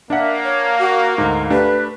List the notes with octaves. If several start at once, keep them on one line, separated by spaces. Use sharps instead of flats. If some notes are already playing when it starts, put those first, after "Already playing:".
A#3 D4 E5 F#5
C#5
F#4
D2 G#2 A#5
A3 D4 G4 B4